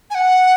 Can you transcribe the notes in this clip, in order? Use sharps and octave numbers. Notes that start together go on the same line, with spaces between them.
G#5
F#5